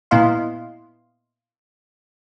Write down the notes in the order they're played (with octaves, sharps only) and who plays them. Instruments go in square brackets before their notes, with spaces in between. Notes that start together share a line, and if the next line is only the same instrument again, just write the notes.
[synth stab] A#2 B3 E4 D#5 F5 C6